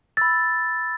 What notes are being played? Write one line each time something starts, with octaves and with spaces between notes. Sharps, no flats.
B5 E6 A6